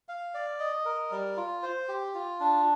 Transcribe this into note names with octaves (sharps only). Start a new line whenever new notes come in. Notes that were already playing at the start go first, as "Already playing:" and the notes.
F5
D5
D#5
A#4
G3
F4
C5
G4
F4
D4